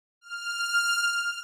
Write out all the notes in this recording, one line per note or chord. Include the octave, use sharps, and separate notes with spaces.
F6